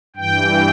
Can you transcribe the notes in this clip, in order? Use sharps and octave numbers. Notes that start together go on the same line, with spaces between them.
G2 E3 G5